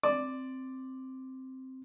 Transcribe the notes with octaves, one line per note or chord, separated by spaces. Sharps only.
C4 D5